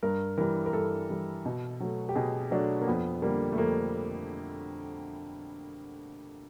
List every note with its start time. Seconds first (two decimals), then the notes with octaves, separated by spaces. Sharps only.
0.03 G2 A#4
0.38 E3 G3 A#4
0.66 A#4
0.73 G2 A4
1.10 E3 G3
1.45 B2
1.80 F#3 A3
2.09 G4
2.15 B2 G#4
2.51 F#3 A3 D4
2.81 A#3
2.88 F2 B3
3.22 D3 G3 A#3
3.52 A3
3.58 F2 A#3